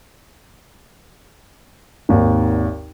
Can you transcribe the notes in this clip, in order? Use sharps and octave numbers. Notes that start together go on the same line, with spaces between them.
G#1 D#2